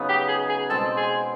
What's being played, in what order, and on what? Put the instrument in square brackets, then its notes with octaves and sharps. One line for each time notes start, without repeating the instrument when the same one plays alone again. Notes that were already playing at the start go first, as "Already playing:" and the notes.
Already playing: [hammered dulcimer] C#3 F#3 B3 D#4
[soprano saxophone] G4
G#4
G#4
[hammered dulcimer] B2 G#3 C4 [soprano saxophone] A4
[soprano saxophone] G#4